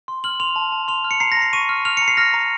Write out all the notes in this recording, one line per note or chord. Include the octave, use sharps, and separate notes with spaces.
C6
F6 F#7
C6 F7
A5
A5
C6 F7
F6
C#7
A#5 C7
A#6
A#5
C7
C#6 D#7
F6
F6 F7
A#5 C#7
C7
F6 A#6
A#5